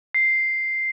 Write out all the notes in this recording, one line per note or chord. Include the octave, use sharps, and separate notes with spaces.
C7